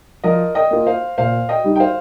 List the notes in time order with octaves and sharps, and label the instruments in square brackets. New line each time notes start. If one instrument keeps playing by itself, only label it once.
[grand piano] F3 [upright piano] A#4 D#5
[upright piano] D#5 G5
[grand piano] A#3 F4
[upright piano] C5 F5
[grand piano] A#2 [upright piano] C5 F5
[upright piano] D#5 G5
[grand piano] G3 D#4
[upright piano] G5
C5 F5